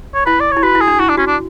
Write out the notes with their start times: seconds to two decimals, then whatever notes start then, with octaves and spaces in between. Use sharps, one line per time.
0.14 C#5
0.26 E4 B4
0.40 D5
0.51 C#5
0.57 E4
0.63 F#4 B4
0.75 E4
0.81 G#4
0.88 D4
0.99 E4 F#4
1.09 D4
1.17 C#4 F#4
1.27 D4